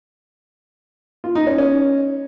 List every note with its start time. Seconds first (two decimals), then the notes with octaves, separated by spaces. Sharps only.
1.24 F4
1.35 D#4
1.47 C#4
1.58 C#4